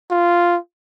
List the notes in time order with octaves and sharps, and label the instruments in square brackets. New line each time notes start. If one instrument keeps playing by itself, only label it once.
[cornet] F4